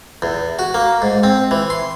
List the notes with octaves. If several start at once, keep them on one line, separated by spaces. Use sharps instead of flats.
E2
F#4
A#3
G#2
C4
E3
C6